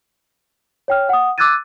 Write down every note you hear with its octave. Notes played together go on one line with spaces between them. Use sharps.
C#5 G5 F6
F#5 D#6
D6 E6 F#6 G#6 A6 D#7